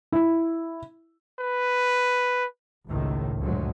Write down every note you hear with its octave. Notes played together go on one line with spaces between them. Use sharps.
E4
B4
G#1 C#2 A2 D#3
D2 G2 A#2 F3 F#3 G#3